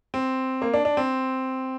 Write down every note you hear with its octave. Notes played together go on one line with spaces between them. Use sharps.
C4
A#3
D4
D4
C4